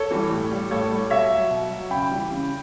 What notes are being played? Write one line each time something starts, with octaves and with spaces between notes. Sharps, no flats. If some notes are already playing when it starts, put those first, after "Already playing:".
Already playing: A4 C#5
E3 G3
A2
G3
A2 A4 C#5
G3
B2 C#5 E5
F#3
B2
F#3
C#3 G5 B5
E3 G3
C#3